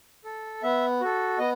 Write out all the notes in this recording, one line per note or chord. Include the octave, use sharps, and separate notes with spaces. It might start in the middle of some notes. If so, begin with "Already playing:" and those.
A4
B3 E5
F#4 A4
B3 D#5